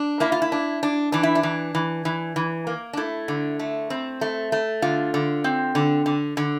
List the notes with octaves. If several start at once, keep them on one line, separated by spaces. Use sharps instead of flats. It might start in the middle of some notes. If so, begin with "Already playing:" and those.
Already playing: D4
A#3 E4
F4
E4
D4
D4
E3 D4
E4
D4
E3
E3
E3
E3
A#3
D4
A3 E4
D3
A3
C4
A3
A3
D3 F4
D3
C4
D3
D3
D3